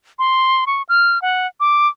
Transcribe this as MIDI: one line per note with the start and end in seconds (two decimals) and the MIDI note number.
0.19 0.65 84
0.67 0.82 85
0.89 1.21 89
1.22 1.47 78
1.60 1.88 86